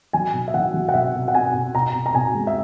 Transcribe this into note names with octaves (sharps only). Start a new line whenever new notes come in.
F#3 G#5
B2
E5
F#3 F#5
F#3
F#5
B2 E5
B2
F#5
B2 G#5
B2
B2 A#5
B2
A#5
B2 G#5
G#3
E5